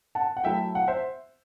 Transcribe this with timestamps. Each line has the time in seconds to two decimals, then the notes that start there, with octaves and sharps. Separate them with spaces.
0.15 F#5 A5
0.37 F#5
0.44 F#3 A3 E4 E5 G5
0.75 F#5
0.88 C5 E5